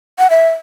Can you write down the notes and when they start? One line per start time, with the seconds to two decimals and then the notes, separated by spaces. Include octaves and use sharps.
0.19 F#5
0.30 E5